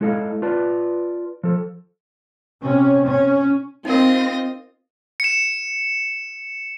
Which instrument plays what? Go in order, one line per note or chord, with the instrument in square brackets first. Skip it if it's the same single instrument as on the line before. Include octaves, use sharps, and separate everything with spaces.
[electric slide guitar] G#3 E4 A4 D#5 F5
F4 B4 D5 A5
F3 A4
[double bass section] C3 C#4
C#4
[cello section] C4 [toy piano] D#4 A#4 [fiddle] F4 D#5
[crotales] C#7 E7